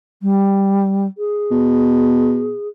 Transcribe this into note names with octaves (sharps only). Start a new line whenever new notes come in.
G3
G#4
B2